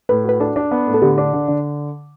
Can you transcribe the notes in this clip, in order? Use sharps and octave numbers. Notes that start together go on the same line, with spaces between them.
A2 B4
F#4 B4
D4 A4
D4
B3
A2
A4
D3 G4
D4
D3
D3